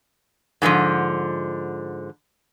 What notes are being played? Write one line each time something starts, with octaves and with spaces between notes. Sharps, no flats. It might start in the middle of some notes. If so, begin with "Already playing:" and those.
G#2 D3 D#3 F3